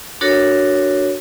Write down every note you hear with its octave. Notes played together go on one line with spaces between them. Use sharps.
D4 F#4 A4 A#4 C#5